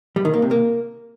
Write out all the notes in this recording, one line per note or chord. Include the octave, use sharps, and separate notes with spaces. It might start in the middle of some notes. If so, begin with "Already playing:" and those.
G3
D#3
A#3
C3
A#3